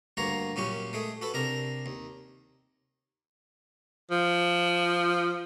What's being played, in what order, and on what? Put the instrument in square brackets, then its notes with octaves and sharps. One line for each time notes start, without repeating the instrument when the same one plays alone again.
[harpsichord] D2 G2 A#3 C#5 F#5 A#5
F#2 A#2 C#4 G4 C#6
G#3 A3 G#4
F#4 A4 B4
C3 D4 A#4 A#5
D#2
[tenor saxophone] F3